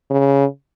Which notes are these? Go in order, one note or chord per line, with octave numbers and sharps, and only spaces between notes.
C#3